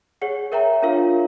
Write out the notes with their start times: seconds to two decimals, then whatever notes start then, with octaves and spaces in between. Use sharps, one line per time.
0.22 G#4 C#5 F#5
0.52 A#4 C#5 E5 G5 A#5
0.83 D4 F4 A#4 C#5 F5